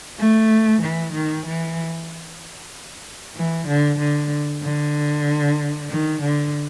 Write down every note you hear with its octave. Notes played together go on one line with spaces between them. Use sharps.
A3
E3
D#3
E3
E3
D3
D3
D3
D#3
D3